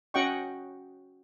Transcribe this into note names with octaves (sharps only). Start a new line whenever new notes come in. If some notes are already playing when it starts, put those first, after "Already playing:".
C#4 F#4 D#5 F#5 G5 C#6